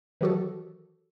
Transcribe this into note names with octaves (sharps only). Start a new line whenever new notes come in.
D#3 E3 F#3 F#4 G4 A4